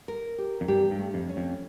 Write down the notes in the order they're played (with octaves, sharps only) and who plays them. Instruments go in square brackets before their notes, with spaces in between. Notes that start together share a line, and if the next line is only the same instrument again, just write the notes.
[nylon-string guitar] A#4
G4
[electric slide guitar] F2
[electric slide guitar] G2 [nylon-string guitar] G4
[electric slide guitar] G2
[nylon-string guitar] A3
[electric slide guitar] F2
[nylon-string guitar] C#4
[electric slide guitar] F2